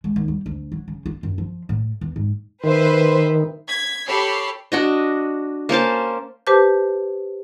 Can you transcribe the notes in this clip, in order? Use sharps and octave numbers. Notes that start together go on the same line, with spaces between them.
G#3
D#2
G3
D2
F#3
C#3
F4
F#2
F3
A2
E2
G#2
D#3 B4 C5 E5
G#6 B6
G4 A4 C#5 B5 C7
D4 F#4 D#5
A#3 C#4 C5 A5
G4 B4 C5 A5 D6 G6